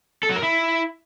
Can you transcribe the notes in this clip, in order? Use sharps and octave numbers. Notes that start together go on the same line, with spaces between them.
A4
F#3
A#4
E4